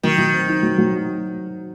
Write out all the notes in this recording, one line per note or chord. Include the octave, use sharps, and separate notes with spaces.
D#3 F#3
F#3
C4
D#4
F#3
F#3